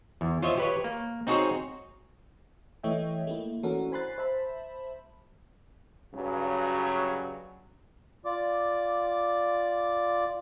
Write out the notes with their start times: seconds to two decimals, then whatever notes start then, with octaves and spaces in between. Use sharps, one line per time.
0.21 E2
0.42 F4 C5 C#5 D#5 E5
0.57 G4 B4 C#5
0.84 A#3
1.27 C4 D#4 F#4 G#4 C5 C#5
2.83 E3 A3 C#5 D#5 E5 G5
3.27 A3 A#3 E4
3.63 E3 C#4 D4 F#4 A4 A#4
3.92 C5 G#5 B5 C6 F#6 A6
4.18 C5 E5 A5 B5
6.15 G2 C#3 F#3
8.25 F4 D5 D6